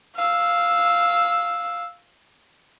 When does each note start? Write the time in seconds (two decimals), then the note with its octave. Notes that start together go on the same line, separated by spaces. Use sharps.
0.16 F5 E6